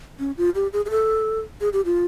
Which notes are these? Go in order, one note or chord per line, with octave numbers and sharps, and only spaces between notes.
C#4
F4
G4
G#4
G#4
A4
G#4
G4
F4